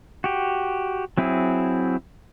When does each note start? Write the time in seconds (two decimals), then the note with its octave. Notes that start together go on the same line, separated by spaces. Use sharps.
0.24 F#4 G4
1.18 F#3 C4 E4 G#4